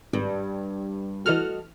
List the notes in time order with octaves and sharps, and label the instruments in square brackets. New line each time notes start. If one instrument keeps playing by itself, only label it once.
[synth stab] G#1 [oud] G2
[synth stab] E3 F6 [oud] F#4 A4 D#5